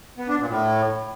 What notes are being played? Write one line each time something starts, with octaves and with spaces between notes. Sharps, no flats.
B3
D4
A#2
A2